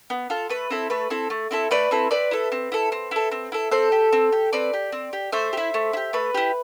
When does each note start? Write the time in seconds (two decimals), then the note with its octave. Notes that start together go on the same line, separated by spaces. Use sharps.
0.10 B3
0.30 F4 A4
0.49 A3 B4
0.70 C4 E4 A4
0.90 A3 B4
1.10 C4 E4 A4
1.30 A3
1.51 C4 E4 A4
1.71 A3 B4 D5
1.91 C4 E4 A4
2.11 C4 B4 D5
2.31 E4 A4
2.52 C4
2.72 E4 A4
2.92 C4
3.11 E4 A4
3.32 C4
3.52 E4 A4
3.71 C4 A4 C5
3.92 G4
4.13 C4
4.32 G4
4.53 C4 B4 D5
4.73 G4
4.92 C4
5.13 G4
5.32 A3 C5 E5
5.53 G4
5.57 E4
5.74 A3
5.93 E4
5.97 G4
6.13 A3 B4
6.34 E4 G4